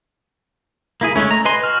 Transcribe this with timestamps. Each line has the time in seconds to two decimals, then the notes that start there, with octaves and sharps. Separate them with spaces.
1.01 A#3 E4 G#4
1.16 G#3 A3 C#4
1.31 A#5
1.45 B4 D#5 G#5 C6
1.64 F#4 F6